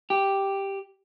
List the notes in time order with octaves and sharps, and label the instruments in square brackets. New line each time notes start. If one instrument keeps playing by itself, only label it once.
[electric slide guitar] G4